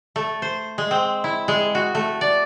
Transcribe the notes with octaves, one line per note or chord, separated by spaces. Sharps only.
A3
C5
G#3
C4
E4
G#3
F#4
A3
D5